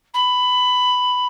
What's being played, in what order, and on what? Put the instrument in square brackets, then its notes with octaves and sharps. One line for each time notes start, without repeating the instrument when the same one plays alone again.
[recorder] B5